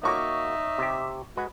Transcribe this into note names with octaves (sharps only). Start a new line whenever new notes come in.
A#3 D#4 F#4 C#5 E5 C#6 D6
C3 G4
G#3 F#4 B4